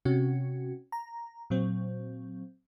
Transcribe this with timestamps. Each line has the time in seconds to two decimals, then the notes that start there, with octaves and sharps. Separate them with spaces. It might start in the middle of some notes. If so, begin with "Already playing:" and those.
0.05 C3 C#4 F#4
0.92 A#5
1.50 A#2 F#3 C4